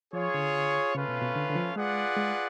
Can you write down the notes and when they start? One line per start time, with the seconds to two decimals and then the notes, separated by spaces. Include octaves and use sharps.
0.13 F3 F4 G#4 C#5
0.34 D3
0.95 C#3 A3 C#4 F4 B4 F5
1.09 B2
1.21 B2
1.36 D3
1.50 D3
1.55 F3
1.76 G#3 F4 G#4 B4 D5 F#5
2.17 G#3